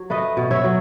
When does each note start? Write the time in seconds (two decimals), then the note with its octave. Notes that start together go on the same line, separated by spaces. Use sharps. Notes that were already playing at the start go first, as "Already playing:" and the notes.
Already playing: F#3 C#5
0.10 A3 B4 D#5
0.37 B2
0.51 C#5 E5
0.64 F#3